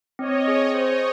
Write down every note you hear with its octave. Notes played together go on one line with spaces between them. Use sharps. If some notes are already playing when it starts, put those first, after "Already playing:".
C4 C#5 D#5
G#4
C5 C#5 D#5